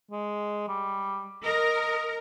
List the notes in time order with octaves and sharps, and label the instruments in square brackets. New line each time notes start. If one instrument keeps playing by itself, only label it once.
[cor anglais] G#3
G3
[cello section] A#4 [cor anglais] D#5